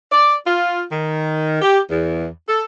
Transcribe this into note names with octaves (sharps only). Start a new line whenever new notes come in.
D5
F4
D#3
G4
E2
A4